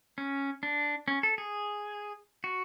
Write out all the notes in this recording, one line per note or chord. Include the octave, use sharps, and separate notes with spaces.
C#4
D4
C#4
A4
G#4
F#4